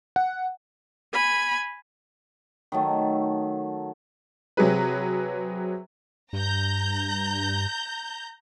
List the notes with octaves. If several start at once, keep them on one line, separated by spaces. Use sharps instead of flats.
F#5
G#5 B5
D#3 F#3 A3
C3 F#3 G#4 B4
G2 A#5 G6